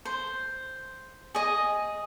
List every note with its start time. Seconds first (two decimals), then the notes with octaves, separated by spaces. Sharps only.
0.05 C5
1.35 G#4 D#5